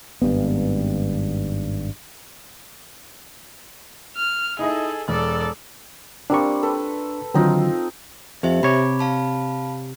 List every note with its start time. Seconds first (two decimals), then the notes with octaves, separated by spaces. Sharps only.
0.22 G#1 G2 B3
4.15 F6
4.59 D#4 E4 G#4 A4 D#5
5.08 E1 A4 D5
6.30 G3 A#3 C4 D4 C#6
6.63 A4 B4
7.34 D3 D#3 F#3 C4 D#4 F4
8.43 F2 G4 C5 E5
8.63 C3 C#5 B5 D6
8.99 F5 A5 B5